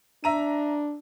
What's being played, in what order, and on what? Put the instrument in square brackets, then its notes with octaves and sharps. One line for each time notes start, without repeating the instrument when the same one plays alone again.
[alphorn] D4 [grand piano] E5 A#5 D#7